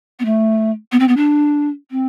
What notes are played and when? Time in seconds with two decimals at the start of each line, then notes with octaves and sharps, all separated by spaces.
0.19 B3
0.25 A3
0.92 B3
0.99 C4
1.08 B3
1.17 D4
1.91 C4